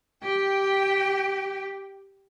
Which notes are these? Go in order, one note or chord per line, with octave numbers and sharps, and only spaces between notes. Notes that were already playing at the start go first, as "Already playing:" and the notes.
G4 G5